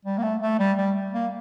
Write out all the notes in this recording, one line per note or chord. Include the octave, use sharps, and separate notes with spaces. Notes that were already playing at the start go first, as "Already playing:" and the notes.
G3
A#3
A3
A3
G3
G3
A#3